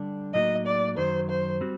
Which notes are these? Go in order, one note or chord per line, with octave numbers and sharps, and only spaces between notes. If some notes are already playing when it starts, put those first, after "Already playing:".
Already playing: D3 G3 D4
A2 F#3 A#3 D#4 F#4 D#5
D5
F#2 D#3 F#3 C5
C5
G3 C4 F#4